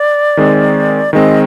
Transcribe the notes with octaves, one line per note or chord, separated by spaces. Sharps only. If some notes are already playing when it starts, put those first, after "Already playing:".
Already playing: D5
D#3 G#3 C4
D#3 G#3 C4 D#5